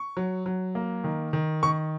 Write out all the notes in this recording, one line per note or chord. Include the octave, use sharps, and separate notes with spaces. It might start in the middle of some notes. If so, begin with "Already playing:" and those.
Already playing: C#6
F#3
F#3
A#3
D#3
D#3
D#3 C#6